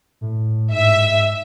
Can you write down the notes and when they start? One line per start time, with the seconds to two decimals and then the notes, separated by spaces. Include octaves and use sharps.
0.21 A2
0.72 G#2 E5
0.84 G#2
0.98 G#2
1.10 G#2